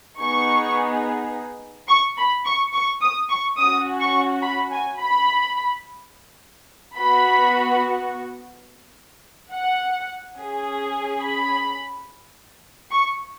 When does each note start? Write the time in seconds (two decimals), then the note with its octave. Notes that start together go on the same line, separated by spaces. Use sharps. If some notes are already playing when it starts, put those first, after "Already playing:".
0.18 B3 D#4 G#4 C#6
1.88 C#6
2.17 B5
2.45 C#6
2.73 C#6
3.01 D#6
3.30 C#6
3.58 C#4 F#4 D#6
4.00 C#6
4.42 B5
4.72 G#5
4.99 B5
6.98 B3 F#4 B5
9.52 F#5
10.37 C#4 G#4
11.22 B5
12.92 C#6